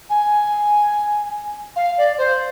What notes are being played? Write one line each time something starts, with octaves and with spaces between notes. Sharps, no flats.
G#5
F5
D5
C5